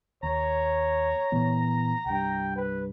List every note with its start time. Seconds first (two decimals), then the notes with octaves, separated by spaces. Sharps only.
0.23 D#2 C#5 A#5
1.32 A#2 E3 B3
2.06 C2 G2 G5
2.56 B4